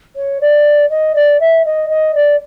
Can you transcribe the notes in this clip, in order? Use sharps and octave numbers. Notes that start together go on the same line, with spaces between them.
C#5
D5
D#5
D5
E5
D#5
D#5
D5